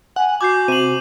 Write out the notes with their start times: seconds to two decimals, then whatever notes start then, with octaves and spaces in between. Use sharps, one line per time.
0.16 F#5 G#5
0.41 F#4 G#5 D6 G6 C7
0.68 C3 D#7 F#7